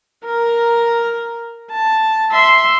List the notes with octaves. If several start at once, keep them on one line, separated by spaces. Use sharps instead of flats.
A#4 A#5
A5
E5 C6